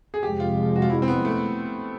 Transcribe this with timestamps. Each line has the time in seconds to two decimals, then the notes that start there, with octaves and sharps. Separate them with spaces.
0.14 G#4
0.22 F2 C3 F3 G#3 G4
0.40 F4
0.76 F#4
0.82 F4
0.90 E4
1.02 C4
1.08 B3
1.25 A3